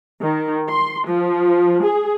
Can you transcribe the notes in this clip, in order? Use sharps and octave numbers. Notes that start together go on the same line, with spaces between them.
D#3
C6
F3
G#4